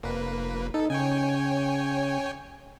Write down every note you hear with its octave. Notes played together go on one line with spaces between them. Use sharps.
F1 A#3 B4
D#4 A4
C#3 C#5 G5 G#5